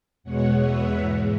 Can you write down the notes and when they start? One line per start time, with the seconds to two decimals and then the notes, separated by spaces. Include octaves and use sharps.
0.23 E2 B2 G#3 B3 C#5 F#5
0.60 B4 E5
0.96 G#2 E3 G#3